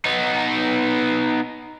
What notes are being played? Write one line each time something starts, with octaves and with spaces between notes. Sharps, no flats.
B3 D#4